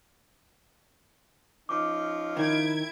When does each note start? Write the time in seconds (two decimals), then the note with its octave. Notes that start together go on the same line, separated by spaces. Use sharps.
1.69 F3 C#4 D#4 D6
2.37 D#3 E4 G#6 D7